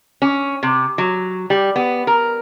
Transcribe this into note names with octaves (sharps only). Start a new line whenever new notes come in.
C#4
C3
F#3
G3
B3
A#4